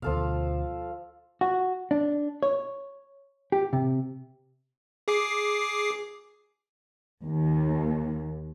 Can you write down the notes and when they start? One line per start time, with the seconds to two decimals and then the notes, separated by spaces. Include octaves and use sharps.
0.02 D2 B2 F3 A4 F5
1.41 F#4
1.91 D4
2.43 C#5
3.52 G4
3.73 C3
5.08 G#4 D6 C7
7.23 D#2